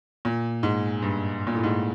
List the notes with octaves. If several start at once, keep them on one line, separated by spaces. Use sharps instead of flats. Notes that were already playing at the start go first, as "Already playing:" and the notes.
A#2
G#2
G2
A#2
A2
G#2